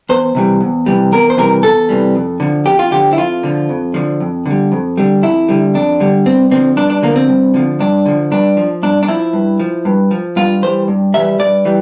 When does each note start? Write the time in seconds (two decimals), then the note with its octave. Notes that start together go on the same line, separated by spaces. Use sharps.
0.09 E2 C5
0.35 C3 E3 G3
0.61 E2
0.86 C3 E3 G3
1.12 E2 A#4
1.30 C5
1.37 C3 E3 G3 A#4
1.63 E2 A4
1.89 C3 E3 G3
2.15 F2
2.40 D3 F3
2.66 F2 G4
2.79 F4
2.91 D3 F3 G4
3.13 E4
3.17 F2 F4
3.43 D3 F3
3.69 F2
3.94 D3 F3
4.20 F2
4.46 D3 G3
4.72 F2
4.97 D3 G3
5.23 F2 E4
5.49 D3 G3
5.74 F2 D4
6.00 D3 G3
6.26 G2 C4
6.51 D3 F3 C4
6.77 G2 D4
6.90 D4
7.03 D3 F3 A#3
7.16 C4
7.28 G2
7.54 D3 F3
7.80 G2 D4
8.06 D3 F3
8.31 G2 D4
8.57 F3
8.83 G2 D4
9.03 D4
9.08 F3 E4
9.33 G2
9.60 F3
9.85 G2
10.11 F3
10.36 G2 F4
10.62 E3 G3 C5
10.88 G2
11.14 E3 G3 E5
11.39 G2 D5
11.65 E3 G3